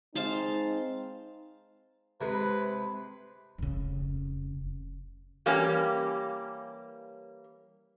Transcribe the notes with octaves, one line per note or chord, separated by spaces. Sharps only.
G#3 C4 D#4 C5 F5 A5
C3 G#3 B4
F1 C#3
E3 G3 A#3 C#4 G4